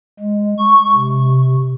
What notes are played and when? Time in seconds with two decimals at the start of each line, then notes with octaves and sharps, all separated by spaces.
0.20 G#3
0.59 C#6
0.95 C3